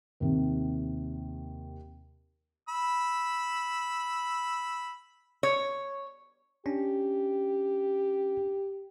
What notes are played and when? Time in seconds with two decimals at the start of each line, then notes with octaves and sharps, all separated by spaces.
0.20 D#2 C3
2.69 B5 E6
5.43 C#5
6.66 C#4 D4 G4